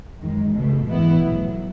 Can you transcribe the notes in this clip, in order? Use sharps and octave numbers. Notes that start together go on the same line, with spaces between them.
F#2 D#3 G#3
C#2 B2 A3
G#2 E3 G#3 B3 E4
B1 A2 F#3